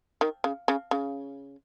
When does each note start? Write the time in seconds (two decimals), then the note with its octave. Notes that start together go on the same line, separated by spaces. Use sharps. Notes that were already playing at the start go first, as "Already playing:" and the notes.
0.21 D#3
0.44 C#3
0.68 C#3
0.91 C#3